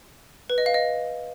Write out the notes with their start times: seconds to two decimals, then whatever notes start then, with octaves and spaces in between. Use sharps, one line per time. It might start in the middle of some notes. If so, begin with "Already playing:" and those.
0.50 B4
0.58 D#5
0.66 F5
0.74 D#5